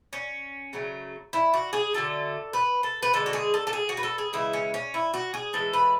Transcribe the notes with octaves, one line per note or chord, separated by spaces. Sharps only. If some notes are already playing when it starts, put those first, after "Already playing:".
C#4
C#3 F#3 A3
E4
F#4
G#4
D3 F#3 A3 A4
B4
A4
B4
D3 G#3 A4
F#4
G#4
A4
A4
G#4
F#4
B4
A4
G#4
C#3 E3 G#3 E4
C#4
C#4
E4
F#4
G#4
A2 E3 G#3 A4
B4